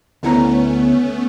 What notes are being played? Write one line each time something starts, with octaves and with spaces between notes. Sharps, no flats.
D2 A3 B3 C#4 E4 A#5